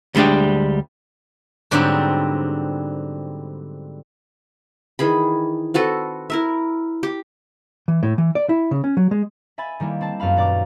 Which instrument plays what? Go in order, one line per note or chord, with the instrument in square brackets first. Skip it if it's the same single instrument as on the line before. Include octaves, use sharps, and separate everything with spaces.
[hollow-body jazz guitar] D2 G3 G#3 D4 G4
[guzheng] G#2 D3 F#3 G3 B3 C4
[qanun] D#3 E3 G#4 B5
C4 F#4 A4 B4
E4 A#4 E5
G4
[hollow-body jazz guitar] E3
A2
E3
D5
E4
C#3
C#4
F#3
G#3
[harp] E5 G#5 B5 A6
D#3 G3 A#3 E4
C4 D5 A5
F#2 B3 F5 B5
D#1 D5 A#5 D6